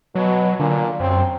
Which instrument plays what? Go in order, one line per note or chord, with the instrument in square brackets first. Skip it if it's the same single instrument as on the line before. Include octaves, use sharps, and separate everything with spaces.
[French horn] B2 [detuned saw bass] F#3
[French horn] A#2 [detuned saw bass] D3
[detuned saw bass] F#2 [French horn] C4